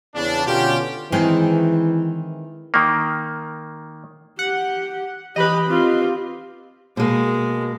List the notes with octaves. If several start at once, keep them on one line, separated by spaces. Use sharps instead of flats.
E2 C#3 D4
B2 D3 B3 C#4 F4 G4
D#3 E3 G#3 C4
D#3 A#3
G4 F#5
E3 G4 B4 D#5 B5
C4 F4 G4
B2 G#3 A#3